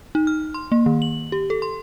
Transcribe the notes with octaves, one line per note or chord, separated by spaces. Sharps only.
D#4
F6
C6
A#3
D#3
F#7
G4
A4
C6